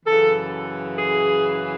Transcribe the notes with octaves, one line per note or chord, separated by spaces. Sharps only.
F#2 C#3 E3 A4
G#4